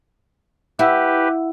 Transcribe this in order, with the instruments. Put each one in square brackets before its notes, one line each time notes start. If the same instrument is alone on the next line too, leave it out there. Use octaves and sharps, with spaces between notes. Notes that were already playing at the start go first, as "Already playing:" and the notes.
[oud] E4 [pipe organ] G4 B4 [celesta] E5 F#5 E6